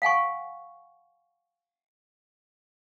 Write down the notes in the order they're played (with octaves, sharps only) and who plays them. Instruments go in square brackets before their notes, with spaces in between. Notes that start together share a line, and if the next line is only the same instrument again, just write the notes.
[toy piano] F5 F#5 G#5 C#6